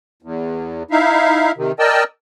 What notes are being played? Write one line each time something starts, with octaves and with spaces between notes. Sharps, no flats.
E2
D#4 E4 E5 F5
C3 D#3
A#4 D5 D#5 G5 A5 E6